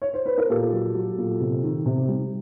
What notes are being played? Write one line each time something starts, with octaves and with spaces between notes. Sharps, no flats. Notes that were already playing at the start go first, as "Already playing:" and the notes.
C#5
C5
B4
A#4
A#2 G4 A4
F#3
F#3
A#2
C3
D#3
C3
G3